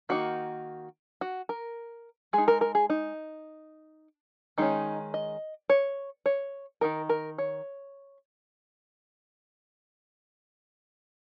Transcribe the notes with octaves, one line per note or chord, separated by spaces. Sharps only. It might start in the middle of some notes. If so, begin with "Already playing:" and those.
D#3 A#3 D#4 F#4
F#4
A#4
G#3 D#4 G#4
A#4
A#4
G#4
D#4
D#3 G#3 C#4 D#4
D#5
C#5
C#5
D#3 A#3 D#4 A#4
A#4
C#5